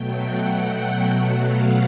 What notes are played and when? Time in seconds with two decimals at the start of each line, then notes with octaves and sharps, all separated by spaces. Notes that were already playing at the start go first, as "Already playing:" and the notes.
Already playing: B2 F#3 A3 G5
0.17 F#5
1.12 B2 F#3 A3
1.43 F5